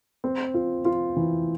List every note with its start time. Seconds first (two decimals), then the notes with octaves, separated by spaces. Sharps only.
0.24 C4
0.54 F4
0.85 F4
1.16 E3